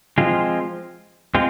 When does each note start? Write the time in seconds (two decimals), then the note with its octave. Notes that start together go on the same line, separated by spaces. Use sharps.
0.18 F3 G#3 C4 F4
1.34 G#3 C4 F4